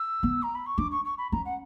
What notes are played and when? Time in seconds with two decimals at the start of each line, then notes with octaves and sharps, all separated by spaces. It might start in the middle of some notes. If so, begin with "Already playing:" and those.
Already playing: E6
0.23 B3
0.43 A#5
0.55 B5
0.66 C#6
0.77 D4 D6
0.91 C#6
1.05 C#6
1.18 B5
1.32 C#4 A#5
1.45 F#5